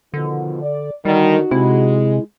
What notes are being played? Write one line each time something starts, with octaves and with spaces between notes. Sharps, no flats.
B2 D3 D#3 F3
D5
D3 D#3 G3 D#4 F#4
C3 G#3 E4